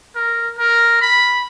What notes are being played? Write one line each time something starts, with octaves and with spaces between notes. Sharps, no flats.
A#4
A#4
B5